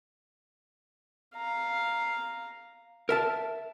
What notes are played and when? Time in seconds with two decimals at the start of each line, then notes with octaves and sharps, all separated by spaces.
1.36 F5 A#5
3.09 A#4 E5 A5